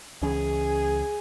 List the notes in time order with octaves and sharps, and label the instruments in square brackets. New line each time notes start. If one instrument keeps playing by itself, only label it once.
[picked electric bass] C#2 E3 C#4 [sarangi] G#4